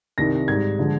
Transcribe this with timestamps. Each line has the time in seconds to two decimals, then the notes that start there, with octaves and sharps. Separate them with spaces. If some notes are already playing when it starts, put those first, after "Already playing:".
0.18 C2 C3 D#3 G3 A#6
0.48 G#2 G3 G#6
0.79 D3 F3 G#3